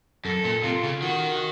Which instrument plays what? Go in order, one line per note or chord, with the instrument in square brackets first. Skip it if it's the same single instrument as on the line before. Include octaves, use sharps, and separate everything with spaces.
[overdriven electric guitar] F#2 [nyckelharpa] A4
[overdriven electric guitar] A#2
[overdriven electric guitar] C3 [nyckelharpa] F4
[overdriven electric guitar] C#3
[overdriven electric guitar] D#3 [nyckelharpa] F#4